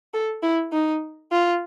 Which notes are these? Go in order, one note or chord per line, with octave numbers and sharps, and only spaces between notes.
A4
E4
D#4
F4